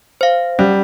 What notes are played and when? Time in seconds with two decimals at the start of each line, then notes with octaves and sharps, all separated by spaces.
0.21 C5 F5
0.59 G3 C#4